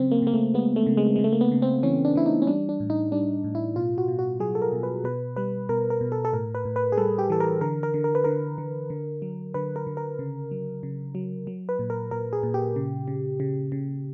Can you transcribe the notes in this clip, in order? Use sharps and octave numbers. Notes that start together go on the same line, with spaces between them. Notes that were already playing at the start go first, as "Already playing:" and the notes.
Already playing: C#3 F#3 C4
A#3
C#3 A#3
A3
G#3 B3
A3
C#3
G#3
G#3
C#3
A3
A#3
B3
C#3
C4
E3 C#4
D4
E3 E4
D#4
C#4
G3 D4
D4
A2
D#4
G3 D4
A2
E4
B2 F4
F#4
B2
F#4
F#3 G#4
A4
A#4
B2
B4
B2 B4
G3 B4
B2 A#4
A#4
B2
A4
A4
A2 A#4
B4
A2
B4
G#4
G3 A4
G4
E3 A4
A#4
D3 A#4
A#4
D3
A#4
B4
D3 A#4
D3
D3
F#3
D3 B4
A#4
D3
A#4
C#3
F#3
C#3
F#3
F#3
B4
A#2
A#4
A#2 A#4
G#4
A#2
G4
C#3
C#3
C#3
C#3